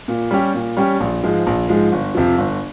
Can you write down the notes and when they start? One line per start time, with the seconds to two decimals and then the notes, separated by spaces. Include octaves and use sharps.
0.08 A#2
0.31 G3 C#4 G4
0.54 A#2
0.77 G3 C#4 G4
1.00 A#1
1.23 G#2 F3 G#3
1.46 A#1
1.68 G#2 F3 G#3
1.92 G1
2.15 F2 C3 F3
2.38 G1